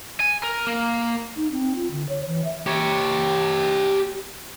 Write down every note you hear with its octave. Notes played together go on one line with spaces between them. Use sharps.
G#5
A#4
A#3
D#4
C4
F4
D3
C#5
E3
E5
G4 C#5